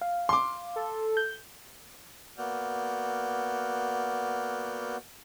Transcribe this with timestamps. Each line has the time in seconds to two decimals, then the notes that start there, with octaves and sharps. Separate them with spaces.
0.01 F5
0.29 C6 D6
0.76 A4
1.17 G6
2.38 A#3 B3 F#4 D5 F6 G6